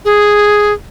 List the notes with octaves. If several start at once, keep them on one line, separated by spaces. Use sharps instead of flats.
G#4